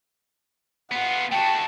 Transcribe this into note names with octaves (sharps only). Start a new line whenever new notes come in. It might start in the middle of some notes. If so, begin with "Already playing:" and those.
B3 F4 F#5
A3 F#4 G5 A5